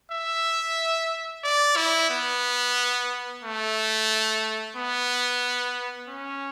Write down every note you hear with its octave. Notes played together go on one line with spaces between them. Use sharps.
E5
D5
E4
B3
A3
B3
C#4